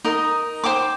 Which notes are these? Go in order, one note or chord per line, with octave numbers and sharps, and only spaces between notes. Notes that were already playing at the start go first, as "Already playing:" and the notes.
D#4 A#4 D#5
C5 G5 D6